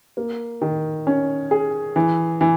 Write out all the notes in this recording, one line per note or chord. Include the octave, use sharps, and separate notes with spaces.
A#3
D#3
C#4
G#4
E3
E3